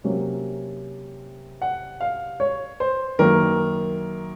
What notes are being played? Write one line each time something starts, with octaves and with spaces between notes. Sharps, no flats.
C3 F#3 A#3 C#4
F#5
F5
C#5
C5
F#2 D#3 A#3 A#4